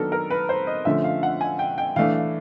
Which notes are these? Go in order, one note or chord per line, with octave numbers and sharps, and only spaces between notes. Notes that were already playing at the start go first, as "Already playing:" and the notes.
Already playing: D#3 F#3 B3 D4 A4 A#4
A#4
B4
C5
D#5
D3 F3 A3 C#4 E5
F5
F#5
G#5
G5
G5
E3 A3 D4 F5
F5